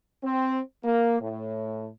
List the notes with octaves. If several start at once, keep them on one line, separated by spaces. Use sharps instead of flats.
C4
A#3
A2